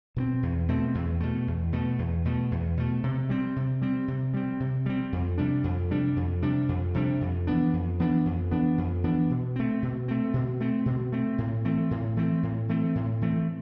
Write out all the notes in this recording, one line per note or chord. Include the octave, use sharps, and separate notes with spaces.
B2 A3 C4
E2
B2 A3 C4
E2
B2 A3
E2
B2 A3
E2
B2 A3
E2
B2 A3
C3
G3 C4
C3
G3 C4
C3
G3 C4
C3
G3 C4
F2
C3 G3 D4
F2
C3 G3 D4
F2
C3 G3 D4
F2
C3 G3 D4
F2
E3 B3 D4
F2
E3 B3 D4
F2
E3 B3 D4
F2
E3 B3 D4
B2
A3 C4
B2
A3 C4
B2
A3 C4
B2
A3 C4
A2
E3 A3 C4
A2
E3 A3 C4
A2
E3 A3 C4
A2
E3 A3 C4